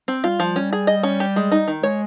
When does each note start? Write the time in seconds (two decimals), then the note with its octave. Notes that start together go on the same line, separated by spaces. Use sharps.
0.08 C4
0.24 G3 F4
0.40 F3
0.56 G3 C#4
0.73 G#4
0.87 D#5
1.03 C#4
1.20 G4
1.36 G#3
1.51 D#4
1.68 D#3
1.83 G#3 C#5